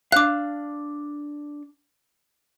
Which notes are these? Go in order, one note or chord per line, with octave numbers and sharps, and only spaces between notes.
D4 F5 D6 F#6